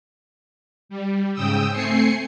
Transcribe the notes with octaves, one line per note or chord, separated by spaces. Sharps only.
G3
G#2 C#3 G5 D#6 E6
A3 C4 G#5 C7 C#7